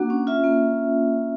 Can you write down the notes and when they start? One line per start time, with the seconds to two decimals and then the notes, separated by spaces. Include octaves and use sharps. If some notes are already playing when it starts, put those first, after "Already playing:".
Already playing: A#3 D4 F#4 F#5
0.10 C#4
0.27 F4 E5
0.44 A#3